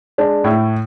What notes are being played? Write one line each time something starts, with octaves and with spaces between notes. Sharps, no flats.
G#3 D4
A2 E4